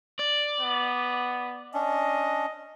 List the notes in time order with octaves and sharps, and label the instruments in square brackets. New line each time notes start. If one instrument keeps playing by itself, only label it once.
[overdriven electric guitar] D5
[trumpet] B3
[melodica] C#4 D4 [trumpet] D#5